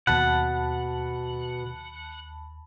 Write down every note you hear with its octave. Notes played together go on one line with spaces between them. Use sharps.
D#2 B2 F#5 A5 B5